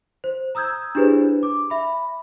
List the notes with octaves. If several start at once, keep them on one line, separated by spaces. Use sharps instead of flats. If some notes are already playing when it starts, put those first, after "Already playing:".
C5
A#5 D#6 E6 G6 G#6
D4 E4 G4 G#4 B4 C5
D6
E5 B5